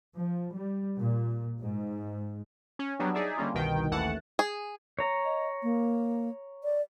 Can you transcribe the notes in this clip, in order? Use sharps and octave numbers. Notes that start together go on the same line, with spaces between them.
F3
G3
A#2
G#2
C#4
F#3 G3 B3 D4
D#4 G#4 D5 E5
D3 G3 A#3 C#4 F4
G1 C2 B2 D#3 G5
A1 D#2 E3 A3 F#5 A5
G#4
C#5 A#5
D#5
A#3
D5